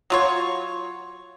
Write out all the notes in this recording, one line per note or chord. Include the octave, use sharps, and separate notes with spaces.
F#3 F4 C#5